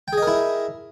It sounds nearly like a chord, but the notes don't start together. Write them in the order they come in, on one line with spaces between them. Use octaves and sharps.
G5 G#4 D#5 A#4 E4